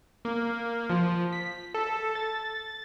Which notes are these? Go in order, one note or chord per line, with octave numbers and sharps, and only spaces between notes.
A#3
F3
B6
A4
A6